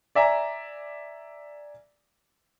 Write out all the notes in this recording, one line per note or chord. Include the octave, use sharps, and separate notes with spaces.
D5 E5 G#5 A#5